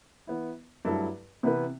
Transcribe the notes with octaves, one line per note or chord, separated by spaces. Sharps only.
E3 B3 E4
G2 F#3 A3 E4 A4
C3 E3 B3 E4 B4